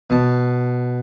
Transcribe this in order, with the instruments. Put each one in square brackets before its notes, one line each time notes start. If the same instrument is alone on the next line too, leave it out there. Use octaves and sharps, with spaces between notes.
[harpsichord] B2 A5